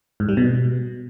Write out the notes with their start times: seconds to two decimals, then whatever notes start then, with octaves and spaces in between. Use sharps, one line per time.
0.20 G#2
0.29 G3
0.37 B2